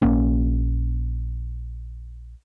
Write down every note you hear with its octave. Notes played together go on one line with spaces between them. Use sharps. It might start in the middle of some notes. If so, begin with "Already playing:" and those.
A#1 A#3 C#4